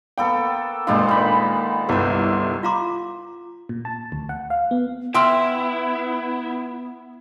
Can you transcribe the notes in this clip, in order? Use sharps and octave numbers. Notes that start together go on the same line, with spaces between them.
A#3 B3 A4 G5
A#2 G#3 B3 D4 F4 C5
D#3 B5
G1 C2 A4 C5
F4 F5 A#5 C6 D6
A#2
A5
D2
F#5
F5
B3
B3 E4 E5 G5 C6 E6 F6